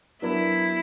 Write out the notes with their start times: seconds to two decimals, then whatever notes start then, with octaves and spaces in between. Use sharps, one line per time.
0.22 F#3 B3 D4 E4 F#4 A#4